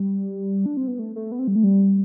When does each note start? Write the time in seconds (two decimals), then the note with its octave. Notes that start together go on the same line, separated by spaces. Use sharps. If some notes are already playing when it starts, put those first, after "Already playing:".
Already playing: G3
0.66 D4
0.77 C4
0.88 B3
0.99 A3
1.16 A3
1.32 B3
1.39 C4
1.47 G3
1.56 A3
1.64 G3